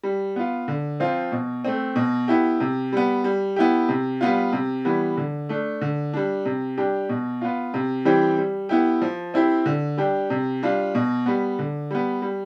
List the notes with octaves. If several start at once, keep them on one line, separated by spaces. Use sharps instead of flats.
G3
B3 F4
D3
F3 C4 F4
B2
A3 C4
B2
B3 E4 G4
C3
G3 B3
G3
B3 E4 G4
C3
G3 B3 F4
C3
E3 G3 B3
D3
A3 D4
D3
G3 D4
C3
G3 D4 G4
B2
B3 F4
C3
E3 G3 C4 G4
G3
B3 E4 G4
F3
C4 E4 G4
D3
G3 D4 G4
C3
G3 D4 F4
B2
G3 B3
D3
G3 B3
G3